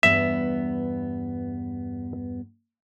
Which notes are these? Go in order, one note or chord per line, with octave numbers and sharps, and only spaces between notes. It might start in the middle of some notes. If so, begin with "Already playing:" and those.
E2 G2 B3 E5